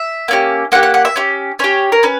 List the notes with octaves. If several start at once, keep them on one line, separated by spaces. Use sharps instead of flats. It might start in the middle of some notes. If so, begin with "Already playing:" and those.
Already playing: E5
A#3 C#4 G4
A#3 C#4 G4 F#5
F#5
F#5
E5
C#4 G4
C#4 G4 C#5
A#4
C#4 B4